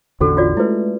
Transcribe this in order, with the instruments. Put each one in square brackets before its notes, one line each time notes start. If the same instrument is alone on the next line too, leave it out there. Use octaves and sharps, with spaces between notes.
[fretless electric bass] A1 E2 D3 [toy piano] C#4 F#4 A4
[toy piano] F4 F#4 D5
[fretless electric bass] G#3 A3 [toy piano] E4 B4